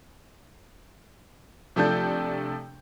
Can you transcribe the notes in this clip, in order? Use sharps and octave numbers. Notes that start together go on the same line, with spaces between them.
C3 F3 A3 D4 A4 G6